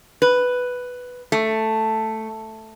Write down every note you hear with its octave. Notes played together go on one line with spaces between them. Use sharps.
B4
A3